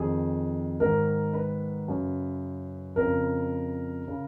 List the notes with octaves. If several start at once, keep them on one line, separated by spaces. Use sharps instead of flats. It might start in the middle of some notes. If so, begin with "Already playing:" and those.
Already playing: F2 D#3 G#4
G#2 D#3 A#4
B4
F#2 C#3
F2 C#3 A#4
C#3